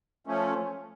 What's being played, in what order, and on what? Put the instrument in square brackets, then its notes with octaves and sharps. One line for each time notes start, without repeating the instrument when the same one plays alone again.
[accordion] F3 A3 C#4